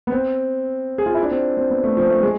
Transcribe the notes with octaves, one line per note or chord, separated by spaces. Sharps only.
B3
C4
G#4
F4
E4
D4
C4
C4
B3
A3
F3
A3
G#3